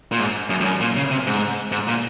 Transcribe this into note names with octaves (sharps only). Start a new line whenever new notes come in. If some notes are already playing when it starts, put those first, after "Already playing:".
A#2
G#2
F#2
F2
F#2
A#2
C#3
C3
G#2
G#2
A#2